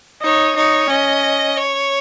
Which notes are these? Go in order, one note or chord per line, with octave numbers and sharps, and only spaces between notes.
D#4 C#5
D#4 C#5
C#4 D#5
C#5